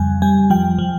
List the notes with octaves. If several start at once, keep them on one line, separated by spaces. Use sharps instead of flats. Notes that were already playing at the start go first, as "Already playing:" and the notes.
Already playing: F2 C#3 G3 G#5
G3 G#5
F3 G5
F3